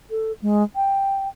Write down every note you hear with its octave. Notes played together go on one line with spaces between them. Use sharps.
A4
G#3
G5